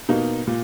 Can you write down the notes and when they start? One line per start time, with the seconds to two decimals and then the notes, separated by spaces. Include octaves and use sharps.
0.09 B2 A#3 D#4
0.47 A#2